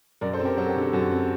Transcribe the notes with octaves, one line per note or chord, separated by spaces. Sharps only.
F#2 A#4 D5
A4 C5
C4
G4 A#4
F#3 F#4 A4
G4
D3
F#4 A4
F#2 F#4 A4
C4